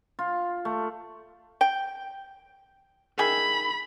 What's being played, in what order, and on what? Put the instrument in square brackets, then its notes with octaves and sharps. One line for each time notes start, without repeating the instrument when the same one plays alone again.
[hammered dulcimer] F4
A3
[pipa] G5
[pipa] D#3 G#4 E5 [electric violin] B5